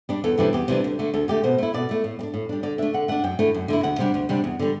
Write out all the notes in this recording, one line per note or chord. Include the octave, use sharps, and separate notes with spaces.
G3 D4
E2 A4
C3 E3 G3 D4
E2 G4
C3 E3 G3 D4
D2
D3 A3
D2 A4
D3 A3 G4
B2 C5
A3 E4
B2 D5
A3 E4
A2
G3
D4
A2
G3 D4
D3 D5
A3 D4 E5
D3 F#5
A3 D4 F#5
F#2 G5
D3 A3 E4
F#2
D3 A3 E4
D2 F#5
C3 G3 D4
D2
C3 G3 D4
E2
D3 G3